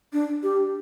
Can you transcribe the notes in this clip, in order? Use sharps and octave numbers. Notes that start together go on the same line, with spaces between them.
D4
G4